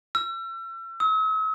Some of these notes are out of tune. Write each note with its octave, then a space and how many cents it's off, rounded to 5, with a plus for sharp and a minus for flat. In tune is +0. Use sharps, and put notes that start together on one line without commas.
E6 +40
E6 -45